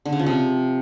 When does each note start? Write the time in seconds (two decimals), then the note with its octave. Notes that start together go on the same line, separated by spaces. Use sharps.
0.06 D3
0.12 C#3
0.19 F3
0.26 C3